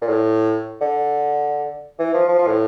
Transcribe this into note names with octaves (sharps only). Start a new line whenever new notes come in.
A#2
A2
D3
E3
F3
F3
F3
A2